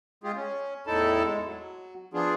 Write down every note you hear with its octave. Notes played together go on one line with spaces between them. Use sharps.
G#3 F4 G4 G#4
C#4
E2 A2 D#4 E4 A4 A5
G#3
F#3
F3 B3 D4 F4 G#4